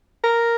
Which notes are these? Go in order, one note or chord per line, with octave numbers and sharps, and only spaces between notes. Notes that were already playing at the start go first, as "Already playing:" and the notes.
A#4